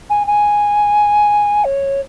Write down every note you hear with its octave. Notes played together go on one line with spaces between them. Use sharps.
G#5
G#5
C#5